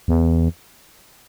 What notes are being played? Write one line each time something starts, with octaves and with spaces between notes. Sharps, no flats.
E2